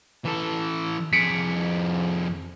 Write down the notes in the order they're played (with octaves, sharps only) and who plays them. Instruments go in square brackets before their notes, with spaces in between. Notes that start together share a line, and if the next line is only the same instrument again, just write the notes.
[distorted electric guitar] E3 A4
[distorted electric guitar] F2 G#4 [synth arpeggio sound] B6 C#7 D7